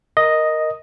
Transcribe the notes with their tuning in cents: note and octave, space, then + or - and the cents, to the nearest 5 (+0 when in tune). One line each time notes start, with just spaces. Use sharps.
A#4 +0 D#5 +0